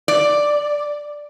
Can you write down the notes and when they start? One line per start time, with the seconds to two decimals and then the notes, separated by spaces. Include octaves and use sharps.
0.08 D5